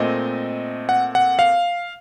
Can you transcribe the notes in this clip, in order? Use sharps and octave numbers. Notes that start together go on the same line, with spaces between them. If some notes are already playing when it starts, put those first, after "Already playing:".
Already playing: A#2 A3 C4 D#5
F#5
F#5
F5